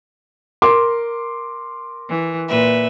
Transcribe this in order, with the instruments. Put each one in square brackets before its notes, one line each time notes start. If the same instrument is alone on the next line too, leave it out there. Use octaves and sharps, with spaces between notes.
[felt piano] A#4 C6 D6
[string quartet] E3
A#2 B4 E5